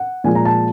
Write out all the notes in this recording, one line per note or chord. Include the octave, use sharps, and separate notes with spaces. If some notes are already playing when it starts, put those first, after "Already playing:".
Already playing: F#5
A#2 F3 G#3 G#5
A#5
A5